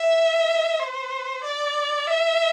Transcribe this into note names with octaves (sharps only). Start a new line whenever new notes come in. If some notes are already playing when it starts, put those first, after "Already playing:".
Already playing: E5
C5
D5
E5